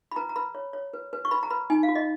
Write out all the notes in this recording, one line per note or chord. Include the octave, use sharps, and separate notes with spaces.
B5
B4 A#5
A#5
B4 B5
C#5
C#5
B4
B4
C#6
B4 B5
A#5
B4 B5
D#4 G#5
F5
F#4
D#5